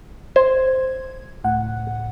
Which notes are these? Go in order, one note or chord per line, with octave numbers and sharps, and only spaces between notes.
C5 G#6
C#2 A2 F#5